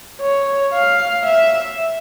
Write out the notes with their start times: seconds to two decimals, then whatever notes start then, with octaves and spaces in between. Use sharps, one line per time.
0.22 C#5
0.74 F5
1.25 E5